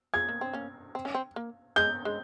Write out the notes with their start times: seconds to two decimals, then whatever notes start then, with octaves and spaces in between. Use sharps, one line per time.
0.14 F4 G#4 G#6
0.29 A#3
0.41 C4
0.53 A#3 C#4
0.95 C4
1.05 C#4
1.14 C4
1.36 A#3
1.76 G#3 G6
2.05 G#3